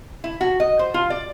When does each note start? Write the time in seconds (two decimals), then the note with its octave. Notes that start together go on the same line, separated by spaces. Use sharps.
0.24 E4
0.41 F#4
0.60 D#5
0.79 C5
0.94 F4
1.10 D5